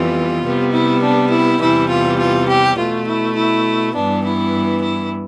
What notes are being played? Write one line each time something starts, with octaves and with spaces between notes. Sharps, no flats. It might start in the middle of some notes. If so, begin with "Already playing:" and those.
Already playing: F2 E3 G3 B3 F4
C3 G3 B3
E4
D4
E4
E2 C3 E3 G3 E4
F4
F4
G4
B2 A3 F4
E4
E4
G2 E3 B3 D4
E4
E4